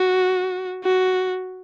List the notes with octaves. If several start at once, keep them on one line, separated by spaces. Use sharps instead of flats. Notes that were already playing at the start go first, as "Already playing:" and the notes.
Already playing: F#4
F#4